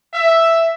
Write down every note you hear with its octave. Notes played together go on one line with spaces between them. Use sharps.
E5